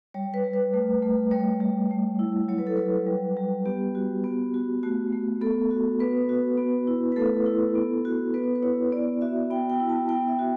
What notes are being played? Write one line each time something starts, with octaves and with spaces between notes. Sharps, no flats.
G3 C#5
B4
G3
B4
A3
A3
G3 C#5
G3
A3
E4
F#3 C#5
B4
A4
F#3 B4
G3
G3
B3 G4
F#4
B3
F#4
A3 F#4
A3
B3 A4
F#4
B3 B4
F#4
B3
E4
B4
A3 A4
E4
B3
F#4
B3 B4
B4
E4 C#5
B3 D5
F#4 E5
B3 G5
G5
E4
A5
B3 G5
E5
F#4